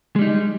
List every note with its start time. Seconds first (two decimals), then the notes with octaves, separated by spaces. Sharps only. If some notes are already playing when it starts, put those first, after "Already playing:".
0.16 G#3
0.19 G3
0.22 D#4